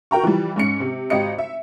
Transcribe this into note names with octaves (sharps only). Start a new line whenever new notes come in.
F#4 A#4 G5 A#5 C#6
E3 F3 G3
G#2 C#4 C#7
C3
G#1 G4 D#5 C#7
E5